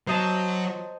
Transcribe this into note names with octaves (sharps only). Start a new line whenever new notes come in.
F#3 C5 D#5 A5